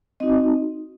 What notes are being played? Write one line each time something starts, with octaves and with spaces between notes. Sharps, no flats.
C4 D#4 F#4 D#5